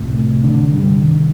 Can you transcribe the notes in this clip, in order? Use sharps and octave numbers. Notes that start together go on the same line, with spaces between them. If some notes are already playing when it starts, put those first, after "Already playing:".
Already playing: C2 A2 C3 A3
D3 D4
D3 D4
G2 G3
D#3